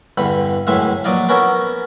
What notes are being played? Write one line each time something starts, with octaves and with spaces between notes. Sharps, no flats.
E2 G2 D3 B5
F#2 A2 E3 G#3 E5 F5
A#1 F#3 D5 D#5 F5
B3 C#4 F#4 A#4 E5